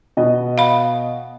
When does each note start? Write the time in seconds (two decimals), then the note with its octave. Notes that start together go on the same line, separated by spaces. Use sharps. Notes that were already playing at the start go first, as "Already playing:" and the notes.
0.17 B2 D#5
0.58 F5 B5